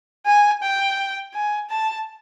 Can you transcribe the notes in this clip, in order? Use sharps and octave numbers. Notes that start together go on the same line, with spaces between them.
G#5
G5
G#5
A5